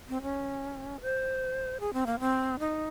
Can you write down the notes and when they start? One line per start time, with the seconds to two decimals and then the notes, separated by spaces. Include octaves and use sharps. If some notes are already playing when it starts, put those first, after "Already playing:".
0.09 C4
0.22 C#4
1.01 C5
1.80 G#4
1.93 C4
2.06 A#3
2.20 C4
2.59 D#4